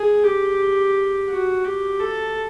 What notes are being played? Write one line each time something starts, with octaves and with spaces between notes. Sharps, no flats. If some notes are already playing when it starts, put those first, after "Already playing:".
Already playing: G#4
G4
F#4
G4
A4